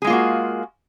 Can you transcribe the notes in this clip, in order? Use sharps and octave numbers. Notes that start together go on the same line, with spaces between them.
G#3 A#3 F4 F#4 G#4